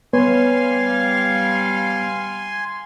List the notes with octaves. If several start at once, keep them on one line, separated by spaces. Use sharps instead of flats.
G3 B3 B4 C#5 F5 G#5 C6